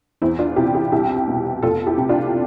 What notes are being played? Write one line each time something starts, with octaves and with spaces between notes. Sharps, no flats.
E2 C4 E4
D4 F4
C3 E4 G4
E4 G4
C2 E4 G4
B2
F1 F4 A4
E4 G4
C3
D4 F4